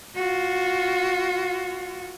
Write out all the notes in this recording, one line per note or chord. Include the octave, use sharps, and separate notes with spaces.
F4 F#4